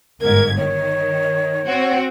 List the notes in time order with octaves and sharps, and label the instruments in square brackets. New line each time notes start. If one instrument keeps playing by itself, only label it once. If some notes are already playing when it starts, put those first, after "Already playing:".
[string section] G1 G#2 G#6 [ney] A#4
[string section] D#3 [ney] C#5
[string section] C4 F#4